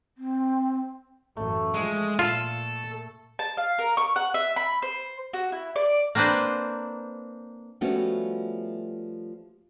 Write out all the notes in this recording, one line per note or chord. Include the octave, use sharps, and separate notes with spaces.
C4
A1 F#2 A3
F3 G#3
A#2 F4 A4
A5
F5
A#4
C#6
F#5
E5
B5
C5
F#4
E4
D5
A#3 C4 D4 B4 C5
F3 G3 A3 B3 C#4 F#4